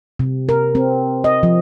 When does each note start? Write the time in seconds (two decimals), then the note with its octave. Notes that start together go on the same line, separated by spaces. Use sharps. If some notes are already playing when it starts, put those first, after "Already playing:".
0.19 C3
0.49 A#4
0.75 C4
1.24 D#5
1.43 F3